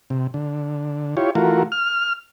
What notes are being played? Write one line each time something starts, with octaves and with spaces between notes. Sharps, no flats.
C3
D3
E4 F4 G4 C#5
E3 A3 F4 F#4 A#4
F6